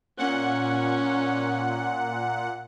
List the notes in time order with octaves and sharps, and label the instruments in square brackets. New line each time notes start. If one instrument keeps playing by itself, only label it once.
[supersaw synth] A#2 F#5 [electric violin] C#4